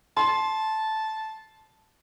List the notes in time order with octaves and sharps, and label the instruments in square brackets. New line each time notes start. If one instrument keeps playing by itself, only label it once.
[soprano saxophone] A5 [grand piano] C6